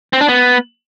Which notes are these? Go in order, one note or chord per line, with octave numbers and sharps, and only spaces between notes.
C4
D4
B3